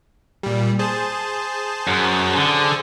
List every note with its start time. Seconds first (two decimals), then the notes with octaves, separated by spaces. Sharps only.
0.43 A#2 G3
0.79 G#4 C5 A5
1.88 F#2
2.37 D3